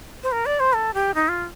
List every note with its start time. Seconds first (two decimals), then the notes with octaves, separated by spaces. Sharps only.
0.23 C5
0.32 A#4
0.46 D5
0.60 C5
0.73 A4
0.94 G4
1.14 D#4
1.28 F4